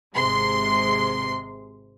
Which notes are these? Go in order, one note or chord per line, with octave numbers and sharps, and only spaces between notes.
G#1 C3 G#3 C6